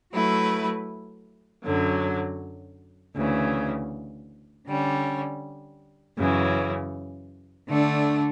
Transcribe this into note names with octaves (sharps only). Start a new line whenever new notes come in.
F#3 A3 E4 B4
F#2 D3 F#3
D2 C#3 E3
D3 G3 C#4
F#2 C#3 E3
D3 A3 D4